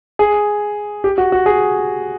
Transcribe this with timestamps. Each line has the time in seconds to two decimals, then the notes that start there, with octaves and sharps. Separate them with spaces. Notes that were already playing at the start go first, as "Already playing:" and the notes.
0.19 G#4
1.04 G4
1.18 F#4
1.32 F#4
1.46 G#4